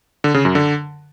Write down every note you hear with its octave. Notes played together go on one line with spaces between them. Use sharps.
D3
C#3
F#2
D3